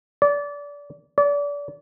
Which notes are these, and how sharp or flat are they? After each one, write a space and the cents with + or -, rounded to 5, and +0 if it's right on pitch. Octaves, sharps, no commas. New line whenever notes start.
D5 -25
D5 -30